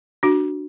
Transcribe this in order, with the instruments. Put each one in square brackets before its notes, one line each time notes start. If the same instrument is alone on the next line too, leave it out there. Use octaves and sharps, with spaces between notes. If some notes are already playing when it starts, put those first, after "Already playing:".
[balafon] D4 F#4